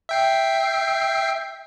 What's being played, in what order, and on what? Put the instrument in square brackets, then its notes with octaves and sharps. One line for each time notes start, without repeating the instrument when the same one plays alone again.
[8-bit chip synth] E5 G5 C7